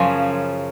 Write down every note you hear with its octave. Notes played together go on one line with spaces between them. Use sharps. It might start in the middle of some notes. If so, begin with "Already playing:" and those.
Already playing: F#2 C#3 F3 C#4